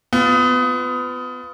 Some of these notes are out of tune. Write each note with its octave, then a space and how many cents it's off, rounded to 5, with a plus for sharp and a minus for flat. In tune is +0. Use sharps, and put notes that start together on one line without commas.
B3 +25 F4 +0